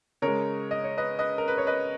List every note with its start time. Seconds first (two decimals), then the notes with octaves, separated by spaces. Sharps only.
0.22 C#3 G#3 A#4 C#5
0.71 D#5
0.84 C#5
0.97 B4 D#5
1.19 B4 D#5
1.38 A#4
1.48 B4
1.58 C#5
1.67 B4 D#5